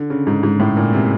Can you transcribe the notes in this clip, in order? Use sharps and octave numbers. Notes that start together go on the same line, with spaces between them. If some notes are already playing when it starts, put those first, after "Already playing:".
Already playing: D3
C#3
G#2
G#2
A2
A#2
C3